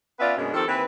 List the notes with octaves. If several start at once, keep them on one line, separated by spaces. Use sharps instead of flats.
B3 C#4 F4 B4 D5 E5
F#2 B2 G#3 A#3 C#4 D4
D#3 F3 C4 G4 A4
D#2 E3 C4 B4